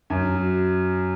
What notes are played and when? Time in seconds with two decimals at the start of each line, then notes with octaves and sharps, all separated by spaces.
0.10 F#2
0.35 F#3